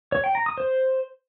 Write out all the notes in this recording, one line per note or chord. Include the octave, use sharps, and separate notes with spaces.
C#5
G5
A#5
D#6
C5